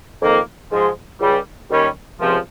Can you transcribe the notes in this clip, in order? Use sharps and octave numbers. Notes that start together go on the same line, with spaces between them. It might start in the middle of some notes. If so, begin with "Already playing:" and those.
F2 D#3 A#3
G#2 F3 G#3
C#2 C#3 G3
D#2 D#3 G3 C#4
C#2 C3 F3